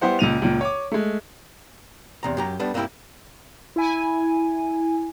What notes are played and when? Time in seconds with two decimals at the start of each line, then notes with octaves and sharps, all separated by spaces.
0.01 G3 B3 E4 G4 C5 F#5
0.19 C#2 A#2 D#7 F7
0.42 C#2 A#2
0.61 C#5 D6
0.92 G#3 A3
2.23 E2 C3 A#5
2.37 F#2 G4 A#5
2.59 G3 A3 B3 D4
2.74 G2 A#3 C4 D4 E4 G4
3.76 E4 G#5